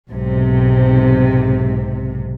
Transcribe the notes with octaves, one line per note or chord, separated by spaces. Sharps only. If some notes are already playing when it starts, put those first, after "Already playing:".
B1 G#2 C3